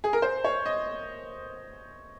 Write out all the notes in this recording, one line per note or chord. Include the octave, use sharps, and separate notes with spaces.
G#4
A#4
C5
C#5
D#5